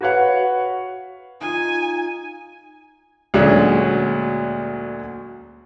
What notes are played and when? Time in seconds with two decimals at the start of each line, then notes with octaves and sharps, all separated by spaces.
0.01 F#4 B4 C#5 F5 F#5
1.41 D#4 F4 G#5
3.34 D2 A#2 F#3 G#3 C#4 D4